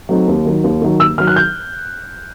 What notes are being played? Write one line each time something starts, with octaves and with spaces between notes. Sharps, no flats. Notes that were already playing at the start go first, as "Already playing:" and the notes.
F#3 A3 C4 D#4
D#2
D#3 F#3
D#2
D#3 F#3
D#2 E6
D#3 F#3 F6
F#6
G6